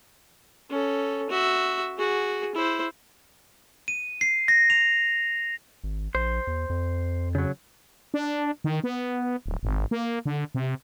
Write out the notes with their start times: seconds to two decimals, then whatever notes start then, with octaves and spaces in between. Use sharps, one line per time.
0.70 C#4 A4
1.30 F#4 E5
1.98 F#4 G#4
2.55 E4 C5
3.88 D#7
4.21 C7
4.48 A#6
4.70 F7
5.84 G#1
6.15 A#1 C5
6.47 E2
6.70 F2
7.35 C#3 F#3
8.14 D4
8.64 D#3
8.84 B3
9.46 D1
9.63 G#1
9.91 A#3
10.26 D3
10.55 C3